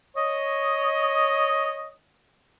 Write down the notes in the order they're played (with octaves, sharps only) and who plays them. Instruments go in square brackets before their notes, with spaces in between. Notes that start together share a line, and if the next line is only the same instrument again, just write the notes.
[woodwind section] C#5 D#5